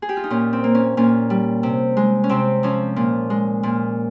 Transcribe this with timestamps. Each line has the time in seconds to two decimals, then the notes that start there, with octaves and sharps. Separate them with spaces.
0.02 G#4
0.09 G4
0.17 F4
0.24 D#4
0.30 A#2 C#4
0.53 C4
0.64 A#3
0.75 C#4
0.97 A#2 C#4
1.30 G3
1.63 C3
1.97 G#3
2.24 C#4
2.29 C3 C4
2.63 F3 C#4
2.96 A#2
3.30 G#3
3.63 A#2